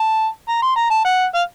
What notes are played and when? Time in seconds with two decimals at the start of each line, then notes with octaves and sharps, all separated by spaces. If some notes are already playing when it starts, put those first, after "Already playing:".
Already playing: A5
0.48 A#5
0.62 C6
0.76 A#5
0.90 A5
1.05 F#5
1.34 F5